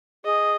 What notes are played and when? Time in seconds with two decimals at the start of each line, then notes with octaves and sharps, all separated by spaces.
0.25 G#4 D#5